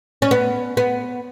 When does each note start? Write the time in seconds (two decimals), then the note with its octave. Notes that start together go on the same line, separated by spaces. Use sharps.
0.22 C#4
0.31 B3
0.77 B3